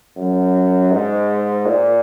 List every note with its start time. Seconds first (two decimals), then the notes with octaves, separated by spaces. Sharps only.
0.16 F#2
0.92 G#2
1.66 A#2